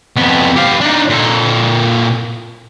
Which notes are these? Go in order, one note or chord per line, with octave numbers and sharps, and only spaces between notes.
F2 B3
G4 F5
D4 D#4
A#2 A4